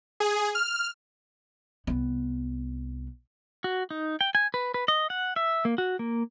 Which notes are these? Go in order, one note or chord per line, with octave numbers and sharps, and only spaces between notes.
G#4
F6
C2 B3
F#4
D#4
G5
G#5
B4
B4
D#5
F#5
E5
A#3
F#4
A#3